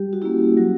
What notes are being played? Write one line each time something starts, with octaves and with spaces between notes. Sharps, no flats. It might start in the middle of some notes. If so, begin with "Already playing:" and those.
Already playing: G3 G4
F#4
A#3 C#4 E4 G4
F#3 F#4